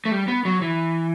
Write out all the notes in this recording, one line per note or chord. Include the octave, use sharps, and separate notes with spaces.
A3
G3
B3
F#3
E3